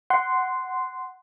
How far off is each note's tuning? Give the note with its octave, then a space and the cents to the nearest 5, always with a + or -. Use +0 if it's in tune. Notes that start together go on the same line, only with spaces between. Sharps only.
F#5 +5 C6 -10